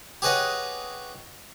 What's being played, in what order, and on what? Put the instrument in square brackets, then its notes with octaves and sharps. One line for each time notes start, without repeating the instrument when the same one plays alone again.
[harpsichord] G4 G#4 B4 C#5 D#5 F#5